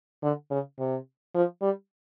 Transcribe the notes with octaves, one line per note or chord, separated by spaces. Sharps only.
D3
C#3
C3
F3
G3